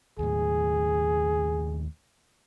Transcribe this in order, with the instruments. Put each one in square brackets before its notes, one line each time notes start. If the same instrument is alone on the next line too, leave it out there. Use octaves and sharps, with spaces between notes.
[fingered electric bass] D#2 A2 [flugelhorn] G#4